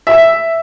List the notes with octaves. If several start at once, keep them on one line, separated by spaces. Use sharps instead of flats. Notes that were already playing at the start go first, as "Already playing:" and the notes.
E5